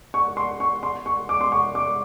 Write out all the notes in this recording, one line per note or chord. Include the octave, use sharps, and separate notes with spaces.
C#6
C6
C#6
C6
C#6
D6
C6
C#6
D6